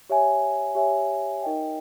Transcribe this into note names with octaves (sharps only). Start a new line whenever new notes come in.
G4 C#5 E5 G#5
G4 C#5 E5 G#5
D#4 A#4 D#5 G5